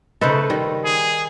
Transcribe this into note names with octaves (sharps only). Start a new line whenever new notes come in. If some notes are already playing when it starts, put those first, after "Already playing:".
C#3 A3 D#4 A4 B4 C5
D#3 G3
G#4